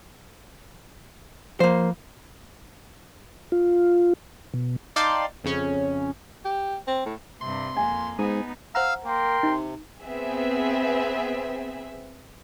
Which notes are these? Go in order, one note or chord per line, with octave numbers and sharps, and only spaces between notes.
F3 A#3 C5
F4
B2
D#4 D5 F5 G5 A5 C6
F2 C#3 C#4
G4
C4
A2
G2 C3 C6
F2 A#3 G#5
G#2 B3 D#4 G#4
C5 F5 F#5 A#5 E6 F6
A#3 A#4 G5 C6
C3 D#4
B3 C4 G#4 E5